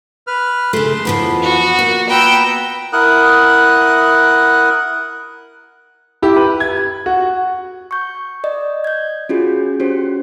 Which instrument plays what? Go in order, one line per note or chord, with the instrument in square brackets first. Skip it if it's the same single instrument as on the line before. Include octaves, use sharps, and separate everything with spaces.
[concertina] B4 F6
[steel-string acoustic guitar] C#3 A3 [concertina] C6
[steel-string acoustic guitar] F2 E3 F3 [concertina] B3
[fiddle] F#4
[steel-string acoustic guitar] A#2
[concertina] B3 B4 A#5 [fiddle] G5 E6
[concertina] E4 A#4 F#5 D#6 F#6
[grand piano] E4 G4
B4
G#6
F#4
[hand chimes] C#6 G6
D5 D#5
G6 G#6
C#4 F4 F#4 G#4
C#4 F#4 G4 C5